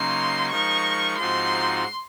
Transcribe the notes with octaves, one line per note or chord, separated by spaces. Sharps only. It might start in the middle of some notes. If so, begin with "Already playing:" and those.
Already playing: C#3 F#3 A#3 D#4 C6
F3 G#3 D#4 A#4 C#6
G#2 F3 C4 D#4 F#4 C6